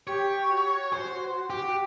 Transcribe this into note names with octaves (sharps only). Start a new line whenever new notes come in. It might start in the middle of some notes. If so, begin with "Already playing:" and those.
G4 C#5
F#4
C5
G4